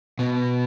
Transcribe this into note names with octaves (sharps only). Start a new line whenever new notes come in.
B2